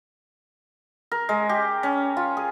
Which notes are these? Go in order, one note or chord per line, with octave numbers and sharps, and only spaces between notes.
A#4
G#3
G4
C#4
F4
G#4